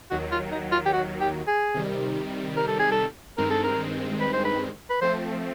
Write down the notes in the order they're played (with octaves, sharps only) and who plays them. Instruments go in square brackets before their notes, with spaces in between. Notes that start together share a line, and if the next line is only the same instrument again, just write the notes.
[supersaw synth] D#2 D#3 F#3 [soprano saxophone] F#4
[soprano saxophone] F4
D#4
F4
G4
F#4
G4
G#4
[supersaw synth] C3 D#3 G3
[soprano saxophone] A#4
A4
G#4
A4
[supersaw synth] G2 D#3 G#3 C4 [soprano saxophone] A#4
[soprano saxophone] A4
A#4
B4
C5
B4
B4
[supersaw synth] F3 A3 C4 [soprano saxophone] C5